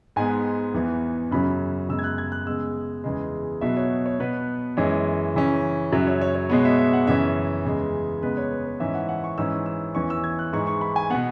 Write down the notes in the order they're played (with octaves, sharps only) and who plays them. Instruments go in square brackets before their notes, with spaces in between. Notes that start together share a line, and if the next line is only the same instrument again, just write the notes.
[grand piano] G#2 G#3 B3 G#5
E2 E3 B3
F#2 C#3 F#3 C#4 B5
F#2 C#3 G#3 B3 E6
G#6
F#6
G#6
F#6
C#3 G#3 B3 E6
E2 C#3 G#3
B2 F#3 B3 E5
C#5
C#5
B2 B3 B4
F#2 E3 G#3 C#5
C#3 E3 C#4
F#2 C#3 F#3 E5
C#5
C#5
C#5
B2 G#3 B3 C#5
E5
E5
F#5
F#2 C#3 E3 C#4 E5
E2 C#3 G#3
C#3 G#3 B3 B4
C#5
B4
B4
G#2 E3 C#4 E5
F#5
F#5
C#6
G#2 E3 C#4 E6
E6
E2 E3 C#4 C#6
E6
G#6
F#6
G#2 E3 G#3 C#6
C#6
B5
G#5
B2 B3 F#5